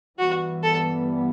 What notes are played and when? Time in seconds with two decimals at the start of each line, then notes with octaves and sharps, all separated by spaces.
0.19 G2 E3 G3 B3 F#4
0.63 A4